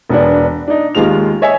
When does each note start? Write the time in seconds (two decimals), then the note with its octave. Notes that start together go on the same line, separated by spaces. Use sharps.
0.09 E1 B3 D4
0.68 D4 D#4
0.95 D#2 D#3 G#3 F4 F7
1.42 C#5 D#5 E5 G#5